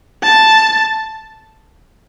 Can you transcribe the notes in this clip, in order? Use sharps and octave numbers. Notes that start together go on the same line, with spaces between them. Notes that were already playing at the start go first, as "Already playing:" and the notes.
A5